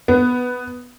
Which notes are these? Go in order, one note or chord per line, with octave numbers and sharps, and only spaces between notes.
B3